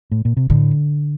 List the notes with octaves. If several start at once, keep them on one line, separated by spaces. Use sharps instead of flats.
A2
A#2
C3
A2 D3